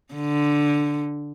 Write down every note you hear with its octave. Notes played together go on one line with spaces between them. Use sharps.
D3